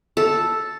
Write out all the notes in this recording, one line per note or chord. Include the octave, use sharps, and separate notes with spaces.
A4